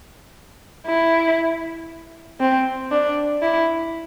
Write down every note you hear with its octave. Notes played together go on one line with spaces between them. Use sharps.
E4
C4
D4
E4